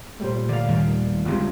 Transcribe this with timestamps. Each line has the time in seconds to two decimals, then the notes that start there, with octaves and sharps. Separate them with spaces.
0.20 A#2 G3 A3 C5
0.49 D3 D5 F5
0.68 D#2 D#3 G3
1.25 G1 C#2 F#2 C3 F4